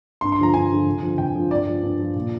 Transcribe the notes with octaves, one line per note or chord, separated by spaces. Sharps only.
G2 C6
C6
D3 F3 A#5
G2 G#5
D3 F3
F2
D3 F3
F2 G5
D3 F3
G2 D5
F3
G2
F3
A#2